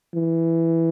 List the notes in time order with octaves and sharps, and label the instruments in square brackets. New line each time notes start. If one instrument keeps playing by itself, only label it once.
[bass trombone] E3